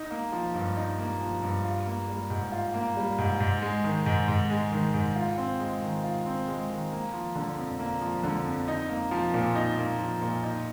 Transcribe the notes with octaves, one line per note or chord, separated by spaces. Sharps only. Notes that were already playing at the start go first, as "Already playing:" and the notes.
Already playing: D#4
A#3
F3
G2
D#4
A#3
F3
G2
F4
A#3
G3
G#2
F4
A#3
G3
G#2
G#2
G#3
D#3
G#2
G#2
G#3
D#3
G#2
F4
C4
G#3
D#3
F4
C4
G#3
D#3
A#3
F3
D3
F2
A#3
F3
D3
F2
D#4
A#3
F3
A#2
D#4
A#3
F3
A#2
D#4